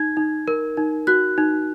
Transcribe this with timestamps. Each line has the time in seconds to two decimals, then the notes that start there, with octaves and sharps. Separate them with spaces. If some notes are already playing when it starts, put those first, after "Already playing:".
Already playing: D#4 G#6
0.17 D#4
0.48 A#4
0.77 D#4
1.07 F#4 F#6
1.38 D#4